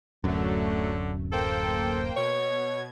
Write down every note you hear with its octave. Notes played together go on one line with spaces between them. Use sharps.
D1 F#2 D3 F#3 A3
A#3 A4 C5 G5
B2 C#5 G#6